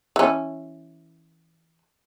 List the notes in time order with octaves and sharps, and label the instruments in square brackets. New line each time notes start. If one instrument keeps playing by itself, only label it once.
[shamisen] E3 C#4